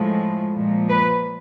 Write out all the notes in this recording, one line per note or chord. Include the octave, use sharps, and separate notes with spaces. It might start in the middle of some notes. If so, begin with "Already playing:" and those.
Already playing: A2 F3 G#3
A#2 F3 G#3
B4